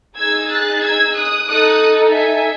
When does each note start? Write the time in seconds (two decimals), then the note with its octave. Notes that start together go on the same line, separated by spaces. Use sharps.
0.17 D#4 G#4 E6 G#6
0.50 F#6 A6
0.82 E6 G#6
1.15 D#6 F#6
1.47 D#4 A4 D#6 F#6
2.12 E5 G#5